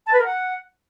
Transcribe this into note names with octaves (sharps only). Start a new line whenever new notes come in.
A5
B4
A#4
F#5